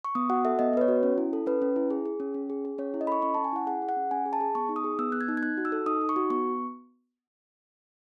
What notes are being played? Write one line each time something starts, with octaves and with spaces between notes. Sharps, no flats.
C#6
B3 D#6
F#4 F#5
A4 E5
B3 D#5
B3 B4
C#5
F#4
C#4
E4
A4
C#4 B4
C#4
E4
G#4
G#4
C#4
C#4
G#4
G#4
C#4 C#5
E4
D#5
A4 B5 C#6
C#4 C#6
C#4 A5
G#5
E4 F#5
G#4 F#5
G#4
F#5
C#4
C#4 G#5
G#4
A5
G#4
B3 C#6
D#4
D#6
G#4
B3 E6
B3 F#6
G#6
D#4
G#6
D#4 F#6
F#4
E6
A4
D#4 D#6
D#4
C#6
F#4
B3 C#6